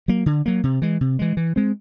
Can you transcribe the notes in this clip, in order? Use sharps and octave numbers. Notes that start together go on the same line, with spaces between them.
F#3 A#3
D3
F#3 A#3
C3
E3 G#3
C3
E3 G#3
E3
G#3 C4